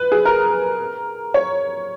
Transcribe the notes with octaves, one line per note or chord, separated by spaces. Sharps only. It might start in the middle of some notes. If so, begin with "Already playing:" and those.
Already playing: B4
G#4
A#4
C#5